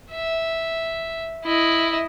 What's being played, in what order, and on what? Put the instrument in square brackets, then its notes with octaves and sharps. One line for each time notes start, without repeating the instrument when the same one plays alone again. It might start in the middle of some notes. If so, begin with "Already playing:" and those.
[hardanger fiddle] E5
E4 D#5